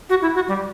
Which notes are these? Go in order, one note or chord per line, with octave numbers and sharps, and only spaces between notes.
F#4
E4
F#4
G3